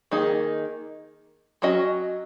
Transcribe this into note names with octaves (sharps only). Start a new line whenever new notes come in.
D#3 A#3 D#4 G#4
F#3 C#4 F#4 D#5